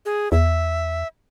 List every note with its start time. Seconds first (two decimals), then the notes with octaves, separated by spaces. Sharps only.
0.06 G#4
0.32 E2 E5